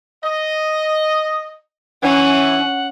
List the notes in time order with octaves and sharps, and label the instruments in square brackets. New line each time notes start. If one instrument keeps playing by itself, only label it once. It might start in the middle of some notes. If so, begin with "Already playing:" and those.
[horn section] D#5
[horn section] E3 [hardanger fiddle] C#4 [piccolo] F#5